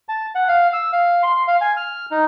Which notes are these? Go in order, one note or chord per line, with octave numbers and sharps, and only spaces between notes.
A5
F#5
F5
E6
F5
C6
F5
G#5
F6
D#4